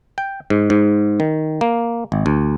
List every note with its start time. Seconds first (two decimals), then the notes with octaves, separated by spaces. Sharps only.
0.18 G5
0.50 G#2
0.70 G#2
1.20 D#3
1.61 A#3
2.12 G#1
2.26 D2